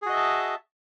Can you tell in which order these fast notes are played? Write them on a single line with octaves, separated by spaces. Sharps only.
G#4 F#4 D#5 E5 A5